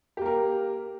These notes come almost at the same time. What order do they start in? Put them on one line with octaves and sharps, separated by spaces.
G4 A#3 A#4